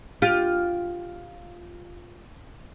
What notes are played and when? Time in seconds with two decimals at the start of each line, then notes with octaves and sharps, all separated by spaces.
0.22 F4 G4